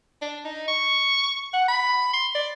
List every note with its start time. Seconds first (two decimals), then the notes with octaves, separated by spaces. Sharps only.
0.22 D4
0.44 D#4
0.68 C#6
1.54 F#5
1.68 B5
2.13 C6
2.35 D5